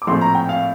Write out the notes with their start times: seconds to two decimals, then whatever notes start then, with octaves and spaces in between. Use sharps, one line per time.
0.02 D6
0.07 A#1 A2 A3 C4 C6
0.21 A#5
0.35 G5
0.49 F5